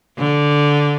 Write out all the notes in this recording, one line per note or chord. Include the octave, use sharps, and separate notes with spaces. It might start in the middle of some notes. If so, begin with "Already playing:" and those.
D3